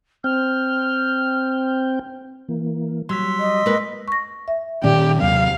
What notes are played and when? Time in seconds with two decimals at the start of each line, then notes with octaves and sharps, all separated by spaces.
0.24 C4 G5 F6
2.49 E3 A#3
3.09 F#3 G3 C6 E6 B6
3.40 D#5
3.66 G#3 A#3 B4
4.08 C#6 A#6
4.48 E5
4.84 A#2 D#3 C#4 G4 D5 G5
5.21 D#2 C3 F#3 F5